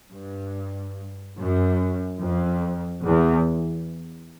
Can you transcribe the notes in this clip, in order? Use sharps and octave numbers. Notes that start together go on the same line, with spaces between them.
G2
F#2
F2
E2